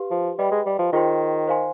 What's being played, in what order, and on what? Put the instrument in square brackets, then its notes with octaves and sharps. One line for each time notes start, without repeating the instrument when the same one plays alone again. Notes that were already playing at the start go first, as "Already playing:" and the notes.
Already playing: [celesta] G4 B4 F5 C6
[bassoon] F3
[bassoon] G3 [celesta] G4 B4 D#5 G5 B5
[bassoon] G#3
G3
F3
[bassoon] D#3 [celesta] F4 G#4 C5 G5 C6
[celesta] C5 F5 G#5 C6